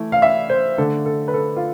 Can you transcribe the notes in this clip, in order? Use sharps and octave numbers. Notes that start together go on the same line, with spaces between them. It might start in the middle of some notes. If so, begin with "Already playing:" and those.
Already playing: E3 A3 E4
F5
E5
C5
D3 A3 D4 A4
A4
B4
A4
F4